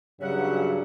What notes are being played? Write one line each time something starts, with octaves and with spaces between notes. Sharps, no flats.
G2 C#3 F#3 C#4 E5 F#5